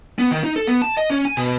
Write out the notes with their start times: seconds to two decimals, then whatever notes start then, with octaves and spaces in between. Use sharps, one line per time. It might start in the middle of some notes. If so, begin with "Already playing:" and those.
0.19 B3
0.31 D#3
0.44 D#4
0.56 A4
0.67 B3
0.82 A5
0.97 D#5
1.10 C#4
1.25 G#5
1.37 B2